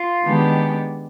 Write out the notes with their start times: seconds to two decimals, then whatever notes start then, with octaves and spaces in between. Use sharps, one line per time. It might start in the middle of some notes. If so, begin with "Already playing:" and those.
Already playing: F4
0.24 D#3 G#3 B3 D4 G4